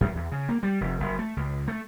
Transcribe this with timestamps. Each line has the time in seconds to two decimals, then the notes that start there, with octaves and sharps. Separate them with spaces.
0.01 F#2
0.15 E2
0.32 C#3
0.49 A#3
0.63 G3
0.81 F1
1.00 F#1
1.19 A3
1.37 C#2
1.68 A3